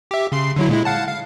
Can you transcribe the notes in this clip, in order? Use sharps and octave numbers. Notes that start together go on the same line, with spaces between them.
G4 E5
C#3 C6 C7
D3 F#3 E4
A#2 G#3 E4
F5 F#5 A5
F5